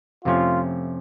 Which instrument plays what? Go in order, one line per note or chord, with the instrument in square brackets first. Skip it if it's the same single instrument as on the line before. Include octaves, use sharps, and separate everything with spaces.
[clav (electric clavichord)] F2 C3 F3 A3 C#4 [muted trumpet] F4